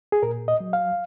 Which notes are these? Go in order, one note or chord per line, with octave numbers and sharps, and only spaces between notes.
G#4
A#2 A#4
D#5
F#3
F5